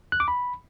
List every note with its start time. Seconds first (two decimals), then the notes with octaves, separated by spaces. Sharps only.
0.12 F#6
0.20 D6
0.28 B5